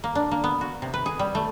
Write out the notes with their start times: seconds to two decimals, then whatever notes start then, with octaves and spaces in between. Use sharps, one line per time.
0.04 A#3
0.15 D4
0.31 A#3
0.44 B3
0.61 F#4
0.82 C3
0.94 B4
1.06 G#4
1.19 G3
1.35 A3